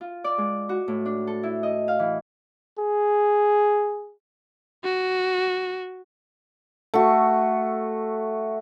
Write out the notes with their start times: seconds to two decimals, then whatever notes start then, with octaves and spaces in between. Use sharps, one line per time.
0.01 F4
0.24 D5
0.38 G#3
0.69 F#4
0.88 A2
1.05 D4
1.27 A4
1.43 E4
1.63 D#5
1.88 F5
1.99 E3
2.79 G#4
4.84 F#4
6.94 A3 F#4